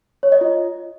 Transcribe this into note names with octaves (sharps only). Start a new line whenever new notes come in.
C#5
D#5
F4